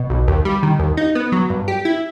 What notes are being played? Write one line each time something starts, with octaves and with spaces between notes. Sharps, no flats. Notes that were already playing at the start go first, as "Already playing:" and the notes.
Already playing: B2
B1
D#2
G3
D#3
D#2
D#4
B3
F#3
G2
G4
E4